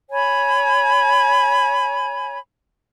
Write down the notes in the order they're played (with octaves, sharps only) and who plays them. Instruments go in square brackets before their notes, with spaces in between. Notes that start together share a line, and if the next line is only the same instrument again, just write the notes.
[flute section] C#5 G#5 B5